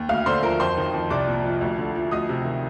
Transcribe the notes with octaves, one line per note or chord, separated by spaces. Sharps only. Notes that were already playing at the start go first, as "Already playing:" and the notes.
Already playing: D#2
D2 F5 F6
D3 C5 C6
F3 A#4 A#5
F2 C5 C6
D#3
F2
C2 D5 D6
A#2
F3
D2
D3
F3
D2 D#5 D#6
C3
D#3